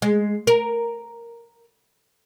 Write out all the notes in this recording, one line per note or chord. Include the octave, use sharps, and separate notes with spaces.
G#3
A#4